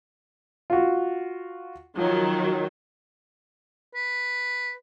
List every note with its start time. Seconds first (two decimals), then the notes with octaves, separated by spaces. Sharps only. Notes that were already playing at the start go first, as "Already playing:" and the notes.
0.70 F4 F#4
1.97 D#3 F3 F#3
3.95 B4